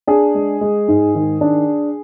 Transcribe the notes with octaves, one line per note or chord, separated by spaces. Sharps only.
D4 G#4
G#3
G#3
G#2
D#3
D4